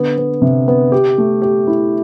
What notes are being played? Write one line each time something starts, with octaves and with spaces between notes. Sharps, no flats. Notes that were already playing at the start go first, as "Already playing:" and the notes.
Already playing: D3 B3
B3
C3
B3
G4
A3
G4
E4